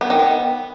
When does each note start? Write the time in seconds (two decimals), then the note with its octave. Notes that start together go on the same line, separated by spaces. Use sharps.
0.01 B3
0.10 D#3
0.19 B3